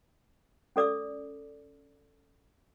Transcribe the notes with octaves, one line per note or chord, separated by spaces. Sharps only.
C#4 A4 D5 D6 E6